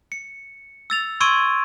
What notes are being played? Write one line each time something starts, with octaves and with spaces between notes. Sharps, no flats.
C#7
E6 A6 F7
C6 C#6 E6 G#6 D7 D#7